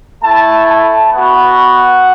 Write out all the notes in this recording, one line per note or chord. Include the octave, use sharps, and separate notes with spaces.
A3 E4 A5
A5
B3 F#4 F#5